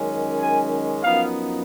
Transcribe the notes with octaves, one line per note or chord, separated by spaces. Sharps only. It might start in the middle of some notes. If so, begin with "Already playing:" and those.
Already playing: F#2 D#3 G#3 C#4
G#5
F#2 F3 B3 D#4 F5